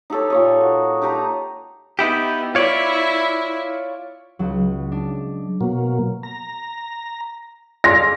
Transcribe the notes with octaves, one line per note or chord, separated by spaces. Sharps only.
D#4 G4 A4 C#5
A#2 C#5 D#5
F#4
D#4 G4 A5 A#5
B3 D#4 E4 G4
E4 F4 C#5 D5
C#2 F#3
D4
B2 F#3 A#3
A#5
G#4 D5 F5 C6 A#6